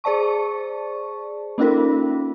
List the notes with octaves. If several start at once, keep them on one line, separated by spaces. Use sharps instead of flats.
G#4 C5 D5 A5 C#6
A#3 C#4 D#4 F4 A4 A#4